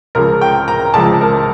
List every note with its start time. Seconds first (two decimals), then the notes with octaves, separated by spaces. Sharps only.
0.15 C#2 C#3 F3 A#4
0.41 G5
0.68 A#5
0.94 C#2 C#3 F3 A5
1.21 A#4